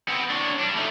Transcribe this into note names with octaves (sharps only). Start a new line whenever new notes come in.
B3 C4
D4 C#5
G3 D4
A3 D#4